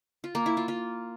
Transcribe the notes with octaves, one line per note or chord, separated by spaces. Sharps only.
F4
A#3
E4
F4
F4